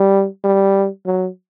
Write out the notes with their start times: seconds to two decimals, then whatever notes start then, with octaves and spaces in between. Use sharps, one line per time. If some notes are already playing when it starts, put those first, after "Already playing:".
Already playing: G3
0.44 G3
1.06 F#3